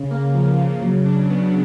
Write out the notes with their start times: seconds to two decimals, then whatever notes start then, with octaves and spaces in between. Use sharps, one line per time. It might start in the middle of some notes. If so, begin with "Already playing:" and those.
Already playing: C#3
0.11 A#3
0.34 F3
0.58 C#3
0.82 F#3
1.06 D4
1.30 B3